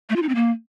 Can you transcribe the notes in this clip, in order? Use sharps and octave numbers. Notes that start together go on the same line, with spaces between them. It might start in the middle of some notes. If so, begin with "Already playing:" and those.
A3
F4
D#4
C4
A#3